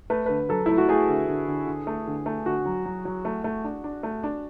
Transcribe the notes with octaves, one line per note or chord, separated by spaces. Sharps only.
A3 B4
D3 B4
F#3 A4
A3 E4
F#4
A3 G#4
D3
D3
D3
D3
A3
D3
A3
D3 F#4
F#3
F#3
F#3
A3
A3
D4
D4
A3
D4